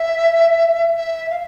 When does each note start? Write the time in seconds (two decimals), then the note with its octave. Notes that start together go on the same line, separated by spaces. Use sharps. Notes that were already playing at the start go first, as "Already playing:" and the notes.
Already playing: E5
0.96 E5
1.31 F5